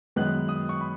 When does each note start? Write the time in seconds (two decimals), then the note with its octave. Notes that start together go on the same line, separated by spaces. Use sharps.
0.16 F#2 D#3 G#3 B3 F#6
0.49 D#6
0.69 C#6
0.81 B5